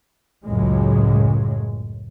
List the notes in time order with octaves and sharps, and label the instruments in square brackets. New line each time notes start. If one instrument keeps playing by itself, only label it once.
[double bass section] C#2 F#2 A2 G#3